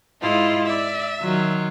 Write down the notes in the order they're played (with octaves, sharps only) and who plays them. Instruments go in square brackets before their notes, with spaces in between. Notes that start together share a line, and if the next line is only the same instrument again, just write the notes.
[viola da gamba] G#2 D#5 [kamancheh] E4 F4
[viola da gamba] D5 [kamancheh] E5
[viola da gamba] D#3 F#3 F4